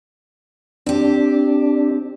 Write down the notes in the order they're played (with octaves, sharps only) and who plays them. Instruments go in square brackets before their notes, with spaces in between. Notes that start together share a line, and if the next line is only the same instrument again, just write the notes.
[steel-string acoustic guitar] C4 G4 [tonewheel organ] D4